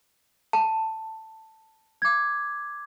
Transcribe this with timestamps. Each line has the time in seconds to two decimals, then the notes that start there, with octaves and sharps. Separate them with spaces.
0.53 A5
2.02 D6 G#6